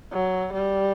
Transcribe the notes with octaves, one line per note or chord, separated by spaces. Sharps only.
F#3
G3